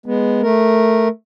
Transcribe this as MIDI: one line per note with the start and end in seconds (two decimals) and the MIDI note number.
0.06 0.41 56
0.06 0.41 59
0.42 1.08 57
0.42 1.08 70